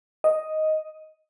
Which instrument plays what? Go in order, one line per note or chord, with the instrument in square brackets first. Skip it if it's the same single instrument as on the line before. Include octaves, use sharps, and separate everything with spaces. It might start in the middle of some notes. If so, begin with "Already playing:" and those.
[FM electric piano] D#5